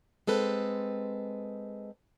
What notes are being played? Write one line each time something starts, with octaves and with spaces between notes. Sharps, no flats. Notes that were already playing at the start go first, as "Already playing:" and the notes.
G#3 C4 A4 B4